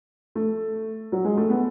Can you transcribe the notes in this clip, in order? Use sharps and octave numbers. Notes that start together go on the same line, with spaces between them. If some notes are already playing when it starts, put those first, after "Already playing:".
A3
F#3
G#3
A3
B3